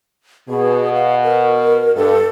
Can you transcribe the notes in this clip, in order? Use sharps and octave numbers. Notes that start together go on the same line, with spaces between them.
B2 G#4
F5
A#4
G2 A4